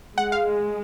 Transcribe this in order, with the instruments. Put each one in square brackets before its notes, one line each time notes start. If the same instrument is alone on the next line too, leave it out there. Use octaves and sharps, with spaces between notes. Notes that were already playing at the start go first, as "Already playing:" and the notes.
[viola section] G#3 [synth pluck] F#5
[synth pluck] F5